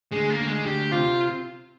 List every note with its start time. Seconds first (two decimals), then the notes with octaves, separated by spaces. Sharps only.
0.12 D2 G#3
0.31 A#3
0.40 D2
0.48 G#3
0.65 D2 G4
0.92 C3 F4